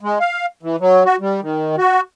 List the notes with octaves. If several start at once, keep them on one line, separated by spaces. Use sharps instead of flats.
G#3
F5
E3
F#3
F#4
G3
D#3
F#4